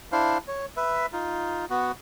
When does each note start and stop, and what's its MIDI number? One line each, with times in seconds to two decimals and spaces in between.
0.12 0.38 62
0.12 0.38 64
0.12 0.38 72
0.12 0.38 77
0.48 0.66 73
0.77 1.06 71
0.77 1.06 76
1.13 1.65 63
1.13 1.65 65
1.70 1.92 59
1.70 1.92 66